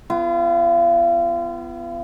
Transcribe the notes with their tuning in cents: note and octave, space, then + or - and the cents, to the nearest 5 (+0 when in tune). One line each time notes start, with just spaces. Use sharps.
B3 +20 F4 -40